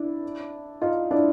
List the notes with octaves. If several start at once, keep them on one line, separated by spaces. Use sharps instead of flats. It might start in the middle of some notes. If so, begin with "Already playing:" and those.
Already playing: D4 E4
D#4 F4
D4 E4